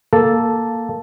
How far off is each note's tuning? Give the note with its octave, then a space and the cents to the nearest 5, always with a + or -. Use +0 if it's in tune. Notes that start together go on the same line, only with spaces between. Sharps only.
A#3 +0 A4 +0